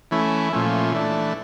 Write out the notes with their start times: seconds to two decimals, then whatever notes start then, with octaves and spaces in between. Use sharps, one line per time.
0.11 E3 A3 C#4 E4
0.53 A#2 F3 A3 C#4
0.92 E3 A3 D4